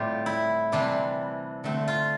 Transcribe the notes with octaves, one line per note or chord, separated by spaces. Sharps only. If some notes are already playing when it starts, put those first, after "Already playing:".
Already playing: A2 G3 C4 F4 G4
E4
C3 E3 G3 C4 D4
D3 A3 C4
F4